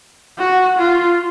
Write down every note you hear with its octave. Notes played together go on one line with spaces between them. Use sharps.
F#4
F4